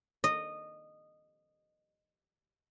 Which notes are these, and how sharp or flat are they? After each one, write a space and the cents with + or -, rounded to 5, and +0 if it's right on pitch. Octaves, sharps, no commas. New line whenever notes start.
D#5 -15